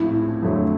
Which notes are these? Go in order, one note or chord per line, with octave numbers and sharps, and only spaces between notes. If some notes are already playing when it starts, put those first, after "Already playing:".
Already playing: A#1 A2 F3 G#3 C4 E4
F2 D3 F#3 A3